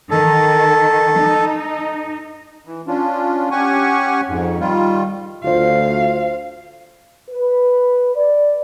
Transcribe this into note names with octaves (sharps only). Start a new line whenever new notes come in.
D#3 A4
D#4
E3
C#4 D4 F4
C#4 G4 F#5 G#5 C#6
F2 G#2
D#3 G3 F4
D2 F4 C5 F5
B4
D5